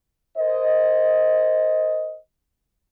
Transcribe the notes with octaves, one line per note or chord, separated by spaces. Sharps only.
A#4 C5 D#5